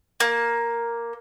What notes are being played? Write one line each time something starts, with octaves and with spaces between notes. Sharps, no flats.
A#3